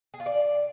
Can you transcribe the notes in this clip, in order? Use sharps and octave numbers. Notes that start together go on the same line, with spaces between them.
G#4
F4
D5